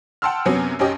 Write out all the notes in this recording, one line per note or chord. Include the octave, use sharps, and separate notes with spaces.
F#5 G5 A5 C6 E6 F6
F#2 C3 F#3 B3 C#4
B1 F#2 C#4 G4 D#5